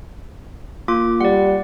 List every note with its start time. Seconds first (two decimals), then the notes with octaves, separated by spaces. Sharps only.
0.88 A#3 F4 D6
1.21 G3 D5 F#5